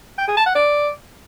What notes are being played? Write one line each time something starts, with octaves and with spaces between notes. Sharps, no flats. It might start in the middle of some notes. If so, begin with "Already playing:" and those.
G5
G#4
A5
F#5
D5